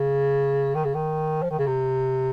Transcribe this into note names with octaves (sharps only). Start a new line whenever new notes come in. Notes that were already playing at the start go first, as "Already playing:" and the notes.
Already playing: C#3
D#3
C#3
D#3
F3
D#3
C#3
C3